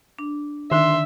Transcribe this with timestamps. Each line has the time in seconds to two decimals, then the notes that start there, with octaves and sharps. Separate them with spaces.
0.19 D4
0.71 D3 D#3 D4 E5 C6